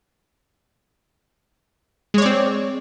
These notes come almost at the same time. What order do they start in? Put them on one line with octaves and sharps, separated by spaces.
G#3 C#5 D5 C4